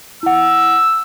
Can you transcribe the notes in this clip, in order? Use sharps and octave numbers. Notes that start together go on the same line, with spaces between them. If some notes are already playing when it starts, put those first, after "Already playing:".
E4 F#5 E6